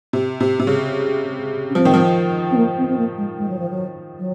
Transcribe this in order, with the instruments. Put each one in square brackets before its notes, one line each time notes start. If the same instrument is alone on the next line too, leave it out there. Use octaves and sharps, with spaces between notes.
[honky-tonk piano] C3
C3
C3
C#3
[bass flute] C#4
[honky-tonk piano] F3 [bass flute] C4
[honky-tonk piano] D#3
F3
[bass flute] C4
A#3
C4
C4
A#3
G#3
G#3
F#3
F3
F#3
F#3